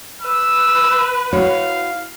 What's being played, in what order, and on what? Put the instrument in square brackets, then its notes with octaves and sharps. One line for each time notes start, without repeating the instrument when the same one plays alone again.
[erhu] B4 [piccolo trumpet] E6
[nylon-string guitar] E4 F#4 C#5 [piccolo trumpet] F5